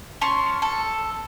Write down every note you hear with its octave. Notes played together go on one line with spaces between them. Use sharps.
C#4 A5 C6 C#6
A4